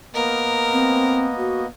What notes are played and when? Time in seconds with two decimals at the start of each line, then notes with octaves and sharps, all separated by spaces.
0.14 A#3 B3 A#4 D#5
0.71 C4
1.37 F#4